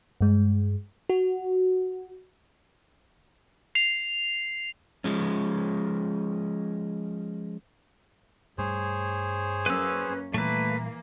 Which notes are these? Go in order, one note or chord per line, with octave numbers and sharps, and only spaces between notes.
G2 G#3
F#4
C7 F7
F3 G#3 C#4
G2 G3 A3 G#4 C5 C#5
F#2 A#3 C#4 B4 E6
A#2 E3 G3 A3 A#3 B4